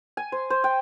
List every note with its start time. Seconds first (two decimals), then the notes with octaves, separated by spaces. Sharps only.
0.17 G#5
0.32 C5
0.50 C5
0.64 G5